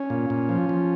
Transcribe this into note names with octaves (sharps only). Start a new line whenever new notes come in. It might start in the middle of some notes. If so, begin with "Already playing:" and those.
Already playing: C#4
A#2
A#2
F3
F3